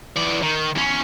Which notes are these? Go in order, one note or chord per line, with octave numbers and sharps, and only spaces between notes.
E3 D5
D#3
E2 C#4